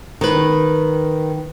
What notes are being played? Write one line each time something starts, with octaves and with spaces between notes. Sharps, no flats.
D#3 B4